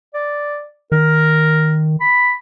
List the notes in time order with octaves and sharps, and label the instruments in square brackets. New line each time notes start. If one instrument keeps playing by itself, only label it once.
[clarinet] D5
[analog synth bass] D#3 [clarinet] A#4
[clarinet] B5